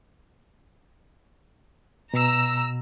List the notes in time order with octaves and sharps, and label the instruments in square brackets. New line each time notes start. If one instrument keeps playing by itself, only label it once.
[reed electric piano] B2 [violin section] A#5 E6